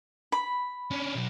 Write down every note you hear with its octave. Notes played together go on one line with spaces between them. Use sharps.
B5
C#4 D4
B2 F#3